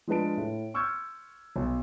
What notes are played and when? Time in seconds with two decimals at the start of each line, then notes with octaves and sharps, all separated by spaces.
0.07 F3 G#3 D4 B4 A5 D7
0.37 A2
0.74 C6 C#6 E6 F6 G6 G#6
1.56 B1